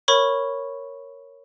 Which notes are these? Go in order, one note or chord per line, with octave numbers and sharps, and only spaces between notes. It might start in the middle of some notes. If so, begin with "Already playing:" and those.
A#4 C#5 B5 C#6